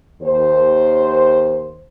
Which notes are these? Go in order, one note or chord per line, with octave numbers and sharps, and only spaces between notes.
D#2 C5